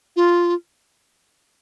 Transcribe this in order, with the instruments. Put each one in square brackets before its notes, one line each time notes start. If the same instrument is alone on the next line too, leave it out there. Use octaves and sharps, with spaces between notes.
[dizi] F4